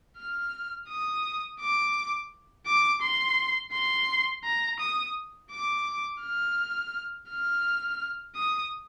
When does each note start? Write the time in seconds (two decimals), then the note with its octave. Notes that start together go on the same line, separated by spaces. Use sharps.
0.17 F6
0.89 D#6
1.60 D6
2.66 D6
3.02 C6
3.72 C6
4.44 A#5
4.79 D#6
5.51 D6
6.22 F6
7.30 F6
8.36 D#6